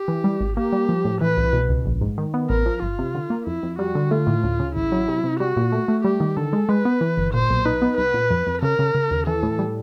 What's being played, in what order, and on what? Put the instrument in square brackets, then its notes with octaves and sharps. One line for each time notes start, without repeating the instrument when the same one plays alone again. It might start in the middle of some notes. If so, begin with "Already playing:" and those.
Already playing: [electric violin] G4
[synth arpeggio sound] E3
G3
G#1
[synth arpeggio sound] A#3 [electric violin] G4
[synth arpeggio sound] G3
F3
A2
[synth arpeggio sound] E3 [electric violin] B4
[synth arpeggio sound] C2
B2
C#2
A#1
G#2
D#3
B3
[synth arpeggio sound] A1 [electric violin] A#4
[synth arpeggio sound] F3
[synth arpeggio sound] G1 [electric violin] F4
[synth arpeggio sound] C3
D3
A#3
[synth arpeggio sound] F2 [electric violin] E4
[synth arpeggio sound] F2
[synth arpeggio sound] G3 [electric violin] F#4
[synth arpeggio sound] D3
[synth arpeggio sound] A3 [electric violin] F4
[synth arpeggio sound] A2
D2
C#3
[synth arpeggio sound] A1 [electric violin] E4
[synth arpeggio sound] F#3
C3
C3
[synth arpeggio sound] G3 [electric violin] F#4
[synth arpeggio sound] A#2
A3
A3
[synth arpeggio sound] G3 [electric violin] G4
[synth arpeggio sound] D#3
[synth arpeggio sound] D3 [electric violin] A4
[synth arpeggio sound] G#3
[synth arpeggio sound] G#3 [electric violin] B4
[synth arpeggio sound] B3
E3
G1
[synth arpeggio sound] A#2 [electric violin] C5
[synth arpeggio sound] B1
[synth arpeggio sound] D#4 [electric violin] B4
[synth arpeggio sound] B3
[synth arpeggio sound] C2 [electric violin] B4
[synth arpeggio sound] A#2
F2
F2
[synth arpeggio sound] C#3 [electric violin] A#4
[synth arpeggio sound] C#3
C#3
D#2
[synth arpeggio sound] E3 [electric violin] A4
[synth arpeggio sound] A2
G3